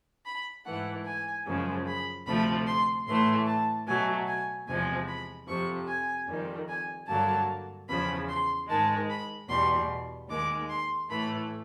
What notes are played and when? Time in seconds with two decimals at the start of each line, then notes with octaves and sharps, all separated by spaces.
0.26 B5
0.66 G#2 E3 A3 F#5
1.06 G#5
1.47 F#2 C#3 F3 G#3
1.87 B5
2.26 D2 C3 F3 A3 B5
2.67 C6
3.07 A2 E3 A3 C6
3.47 A5
3.87 B2 F#3 A3 G#5
4.28 G#5
4.67 E2 C3 F3 G#3 G#5
5.08 B5
5.48 F2 C3 F3 C#6
5.88 G#5
6.28 F2 C3 D#3 G3
6.68 G#5
7.08 G2 D3 F#3 A#3 A5
7.89 E2 C#3 F3 B5
8.29 C6
8.69 G#2 D#3 G#3 A5
9.09 B5
9.49 E2 B2 G3 C6
10.30 D#2 D#3 G#3 D6
10.70 C6
11.10 A2 E3 A3 B5